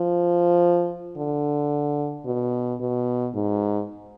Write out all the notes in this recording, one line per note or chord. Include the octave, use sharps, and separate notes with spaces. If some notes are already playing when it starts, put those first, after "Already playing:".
Already playing: F3
D3
B2
B2
G#2